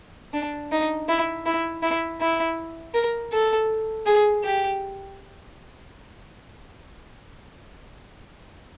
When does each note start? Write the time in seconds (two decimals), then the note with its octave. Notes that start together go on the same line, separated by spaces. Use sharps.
0.34 D4
0.72 D#4
1.09 E4
1.46 E4
1.83 E4
2.21 E4
2.94 A#4
3.33 A4
4.06 G#4
4.44 G4